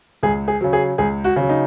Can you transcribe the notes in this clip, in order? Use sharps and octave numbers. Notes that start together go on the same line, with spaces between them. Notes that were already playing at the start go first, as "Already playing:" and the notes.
C#2 G#4
G#4
C#3 F#3
G#4
C#2 G#4
F#4
C#3 F#3
D#4